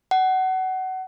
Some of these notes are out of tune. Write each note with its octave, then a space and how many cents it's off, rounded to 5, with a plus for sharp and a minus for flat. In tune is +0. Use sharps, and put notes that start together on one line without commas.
F#5 +25